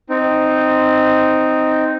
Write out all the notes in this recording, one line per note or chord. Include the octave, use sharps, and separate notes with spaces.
C4 D#4